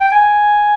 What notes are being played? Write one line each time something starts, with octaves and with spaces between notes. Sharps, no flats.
G5
G#5